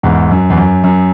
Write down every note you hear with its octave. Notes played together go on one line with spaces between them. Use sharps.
E2 G#2
F#2
E2
F#2
F#2